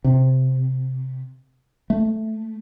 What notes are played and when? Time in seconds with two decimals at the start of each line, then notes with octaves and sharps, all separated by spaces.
0.04 C3
1.90 A3